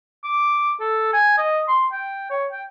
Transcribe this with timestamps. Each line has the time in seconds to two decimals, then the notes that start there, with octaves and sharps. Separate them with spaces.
0.24 D6
0.80 A4
1.13 G#5
1.38 D#5
1.68 C6
1.92 G5
2.30 C#5
2.52 G5